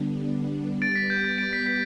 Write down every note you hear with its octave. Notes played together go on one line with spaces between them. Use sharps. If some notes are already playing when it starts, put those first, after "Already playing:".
Already playing: D3 G3 B3 D4
G3 B3 G4 B4 A6 D7
A6
B6
G6
A6
A6 D7
B6
B6